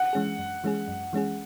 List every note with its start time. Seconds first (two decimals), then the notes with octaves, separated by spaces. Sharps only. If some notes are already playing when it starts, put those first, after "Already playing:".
Already playing: F#5
0.13 E3 G#3 C#4 G#4
0.38 F#2
0.64 E3 G#3 C#4 G#4
0.88 F#2
1.13 E3 G#3 C#4 G#4